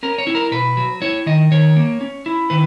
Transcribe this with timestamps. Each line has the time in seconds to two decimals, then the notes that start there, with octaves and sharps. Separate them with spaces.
0.03 C#4 A#4
0.18 C#5
0.27 E4
0.35 A#4
0.51 B2 B4
0.77 F#3
1.02 E4 C#5
1.26 D#3 D#5
1.51 D#3 C#5
1.76 A#3
2.01 C#4
2.26 E4
2.50 D#3 B4